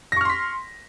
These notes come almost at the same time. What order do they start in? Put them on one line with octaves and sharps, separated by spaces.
A#6 C#6 F6 C6 B6